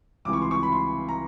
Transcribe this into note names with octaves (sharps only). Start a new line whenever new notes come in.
C#2 C3 E3 G3 D6
C#6
C6
C#6
B5
C6
A#5